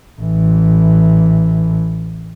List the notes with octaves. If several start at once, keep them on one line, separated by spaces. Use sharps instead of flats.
A1 E3